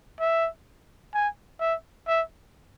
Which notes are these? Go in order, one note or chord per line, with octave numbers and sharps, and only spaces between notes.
E5
G#5
E5
E5